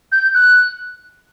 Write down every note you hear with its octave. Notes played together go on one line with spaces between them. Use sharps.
G6
F#6